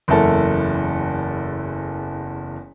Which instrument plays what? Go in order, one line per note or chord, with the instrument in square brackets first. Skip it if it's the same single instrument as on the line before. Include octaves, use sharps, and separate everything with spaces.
[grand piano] F#1 E2 E4 A4 A#4